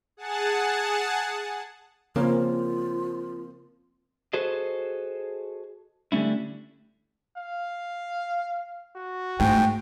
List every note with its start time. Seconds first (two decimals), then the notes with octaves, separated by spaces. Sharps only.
0.17 G#4 F#5 A5
2.16 C#3 F3 A#3 C4 C#4 F4 A#4
4.33 F#4 G#4 A4 C5 D#5
6.12 D3 G3 A3 C#4 E4
7.36 F5
8.95 F#4
9.40 G#2 A3 G5